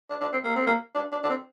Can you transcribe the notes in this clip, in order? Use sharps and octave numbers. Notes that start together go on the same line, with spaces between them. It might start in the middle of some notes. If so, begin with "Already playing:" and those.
D4
D4
C4
A#3
C4
A#3
D4
D4
D4
C4